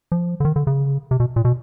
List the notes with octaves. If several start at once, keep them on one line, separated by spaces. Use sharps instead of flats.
F3
D3
D#3
D3
C#3
C3
B2
A#2
B2